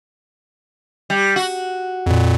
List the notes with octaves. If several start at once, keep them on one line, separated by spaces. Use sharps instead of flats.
G3
F#4
F2 A#2